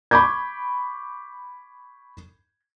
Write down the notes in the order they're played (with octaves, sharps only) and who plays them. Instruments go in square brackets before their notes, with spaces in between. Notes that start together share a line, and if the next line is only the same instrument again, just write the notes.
[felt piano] B5 C#6 D6 G6 G#6